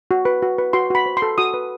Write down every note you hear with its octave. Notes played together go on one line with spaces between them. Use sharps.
F#4
B4
F#4
B4
F#4 C6
F#4 B5
C5
C6
A4
F#4 D#6
B4